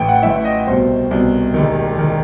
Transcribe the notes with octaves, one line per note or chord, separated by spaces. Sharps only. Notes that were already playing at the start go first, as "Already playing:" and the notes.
Already playing: A1 A2 E3 G5
F#5
A1 A2 E3 E5
D#5
C2 B2 C5
C2 B2
E1 D#2 D#3
D#3